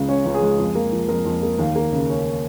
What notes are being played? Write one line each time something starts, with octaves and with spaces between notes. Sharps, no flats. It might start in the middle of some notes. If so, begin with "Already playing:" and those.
Already playing: C#2 C#3 G#3
C#4 C#5
C#2
G#4
G#3
F2
A#3
F3
F2 A#4
F2
A#3
D#2 F5
A#3
C#3
C#4